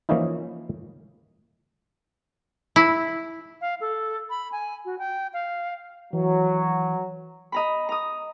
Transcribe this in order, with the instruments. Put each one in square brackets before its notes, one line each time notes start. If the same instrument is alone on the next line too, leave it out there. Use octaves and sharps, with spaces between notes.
[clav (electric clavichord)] E3 F3 A#3 C#4 D#4 E4
[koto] E4
[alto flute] F5
A4
B5
G#5
F#4
G5
F5
[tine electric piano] E3 [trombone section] F#3
[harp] D#5 A#5 B5
A#5 D#6